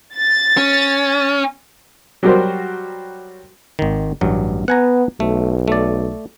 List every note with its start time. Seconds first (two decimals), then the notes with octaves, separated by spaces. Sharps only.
0.17 A6
0.57 C#4
2.23 F#3 G3 F#4 G4 A#4 C5
3.79 G#1 D#3
4.21 A1 G2 F#3
4.68 B3 F#5 G#5 A#5
5.20 B1 A3
5.68 A3 D5